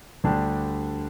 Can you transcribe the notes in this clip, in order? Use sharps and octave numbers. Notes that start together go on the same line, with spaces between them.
D2 D3 G3 D4 G4